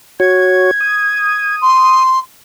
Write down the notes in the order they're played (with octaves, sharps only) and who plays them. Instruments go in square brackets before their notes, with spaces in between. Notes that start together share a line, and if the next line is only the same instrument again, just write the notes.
[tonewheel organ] F#4 C#5 [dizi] G#6
[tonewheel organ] D#6
[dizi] C6